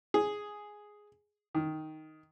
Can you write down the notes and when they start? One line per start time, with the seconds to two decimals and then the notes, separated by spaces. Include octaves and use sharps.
0.14 G#4
1.55 D#3